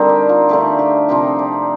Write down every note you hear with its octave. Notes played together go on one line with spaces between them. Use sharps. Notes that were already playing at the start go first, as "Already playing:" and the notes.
Already playing: D3 G3 C4 D#4 A#4 C5 F5
G4
F4
D3 A3 D#4 G4
G4
C3 F3 C4 D#4 G4
D5